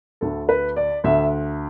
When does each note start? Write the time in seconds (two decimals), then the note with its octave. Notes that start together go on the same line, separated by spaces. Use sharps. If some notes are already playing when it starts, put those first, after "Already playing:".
0.21 D2 D3 A4
0.49 B4
0.76 D5
1.04 D2 D3 E5